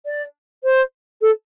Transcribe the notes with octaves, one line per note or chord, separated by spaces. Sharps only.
D5
C5
A4